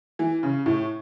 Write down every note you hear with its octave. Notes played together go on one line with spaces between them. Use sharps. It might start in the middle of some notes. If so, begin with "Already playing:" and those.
E3
C#3
A2